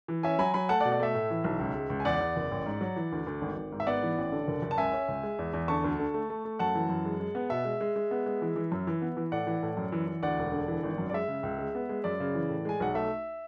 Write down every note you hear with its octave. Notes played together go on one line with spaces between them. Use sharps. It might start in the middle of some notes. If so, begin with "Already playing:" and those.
E3
C#4 E5 G#5
F#3 G#5 B5
F#3 G#5 B5
A3 F#5 A5
B2 D5 F#5
D5
A3 E5
A2
E3
B1
C#2
G#3
C#2
G#5
E2 D5 F#5
E2
F#1
A1
G#2
F#3
E3
D2
D2
G#1
G#1
G#2
E5
B3 D5 F#5
E3
A1
D3
F#1
F#1
A5
C#2 E5 G#5
C#4
C#2
G#3
E2
E2
D3 A5 C#6
D2
D3
A3
A3
A3
F#2 F#5 A5
E3
F#2
G#3
G#3
B3
B2 E5
G#3
G#3
G#3
B3
G#3
E3
E3
F#2
E3
B3
E3
A2 D5 F#5
E3
A2
F#2
E3
E3
D2 D5 F#5
E1
D3
E3
G#1
F#2
D5
G#3 E5
C#3
C#2
G#3
B3
G#3
F#2 D5
C#3
E3
A2
G#3 G#5
B1 F#5
A3 E5